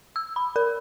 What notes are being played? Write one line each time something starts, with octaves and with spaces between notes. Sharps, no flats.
E6
B5
A#4